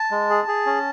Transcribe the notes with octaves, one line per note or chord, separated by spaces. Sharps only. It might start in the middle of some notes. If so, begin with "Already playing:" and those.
Already playing: A5
G#3
G#4
G#4
C#4